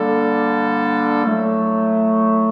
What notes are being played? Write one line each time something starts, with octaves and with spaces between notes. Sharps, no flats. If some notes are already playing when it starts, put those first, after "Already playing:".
Already playing: D3 G3 A#3 D4 A4
A2 F#3 A3